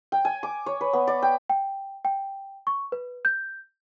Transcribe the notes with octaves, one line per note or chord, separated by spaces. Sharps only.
G5
G#5
D6
C#5
B4
B3
D5
G5
G5
G5
C#6
B4
G6